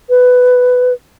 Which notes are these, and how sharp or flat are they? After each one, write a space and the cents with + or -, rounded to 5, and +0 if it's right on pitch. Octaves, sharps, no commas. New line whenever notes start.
B4 +10